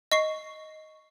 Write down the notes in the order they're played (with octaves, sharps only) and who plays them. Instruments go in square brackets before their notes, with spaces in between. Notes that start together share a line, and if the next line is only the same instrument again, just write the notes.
[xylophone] D#5 C#6 C7